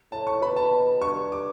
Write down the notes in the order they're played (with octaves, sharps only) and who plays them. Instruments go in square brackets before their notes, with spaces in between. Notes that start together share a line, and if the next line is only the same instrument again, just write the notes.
[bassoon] A2 [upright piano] A5
[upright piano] C#6
[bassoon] B2 [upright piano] B5
[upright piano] A5
[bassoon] G2 [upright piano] C#6
[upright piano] D6